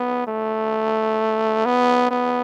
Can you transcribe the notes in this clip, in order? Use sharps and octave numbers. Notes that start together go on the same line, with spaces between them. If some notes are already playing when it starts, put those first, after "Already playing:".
Already playing: B3
A3
B3
B3